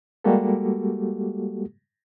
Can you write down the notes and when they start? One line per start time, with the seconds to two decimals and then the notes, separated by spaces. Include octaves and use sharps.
0.24 G3 G#3 A#3 F#4 G4 A4